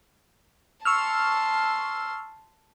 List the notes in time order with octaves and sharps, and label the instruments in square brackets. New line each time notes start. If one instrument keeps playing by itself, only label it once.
[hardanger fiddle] A5 C6 [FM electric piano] C#6 E6 F6